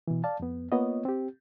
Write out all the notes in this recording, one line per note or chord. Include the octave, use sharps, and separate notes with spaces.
B2 E3
D5 F5 A5
F2 B3
A#3 B3 F4 C#5 D#5
C4 G4